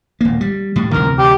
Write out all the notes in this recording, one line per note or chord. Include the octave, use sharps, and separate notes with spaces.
D#1 A#3
G3
A2 G3
D2 C3 E3 A#4
G4